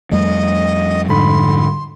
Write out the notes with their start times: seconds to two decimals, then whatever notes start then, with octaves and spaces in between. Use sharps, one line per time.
0.11 F2 G3 A3 D#5
1.09 G#2 D3 B5 C6